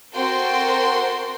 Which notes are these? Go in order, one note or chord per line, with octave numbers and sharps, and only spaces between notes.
C4 F#4 A4 A#4 G5 C6